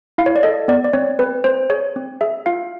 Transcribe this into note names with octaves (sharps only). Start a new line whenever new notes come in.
E4 F5
C#5
D5
A4 D#5
B3 D5
D5
C4 C#5
C4 B4
C4 C5
G#4 C#5
C4
G#4 E5
F4 F5